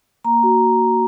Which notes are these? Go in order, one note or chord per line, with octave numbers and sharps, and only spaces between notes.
A#3 A#5
F#4